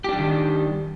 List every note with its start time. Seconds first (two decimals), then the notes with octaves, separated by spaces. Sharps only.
0.04 G4
0.09 D4
0.13 G3
0.17 D#3